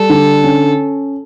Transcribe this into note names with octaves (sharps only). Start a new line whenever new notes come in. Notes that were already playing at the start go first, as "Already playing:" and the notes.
Already playing: G3 A4
D3
C#4